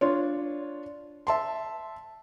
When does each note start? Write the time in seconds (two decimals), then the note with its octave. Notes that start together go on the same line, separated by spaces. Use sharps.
0.01 D4 F4 C#5
1.27 E5 A5 C6